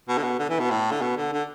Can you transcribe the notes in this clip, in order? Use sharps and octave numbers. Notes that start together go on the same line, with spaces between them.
B2
D3
B2
D3
E3
B2
A2
D3
B2
D3
D3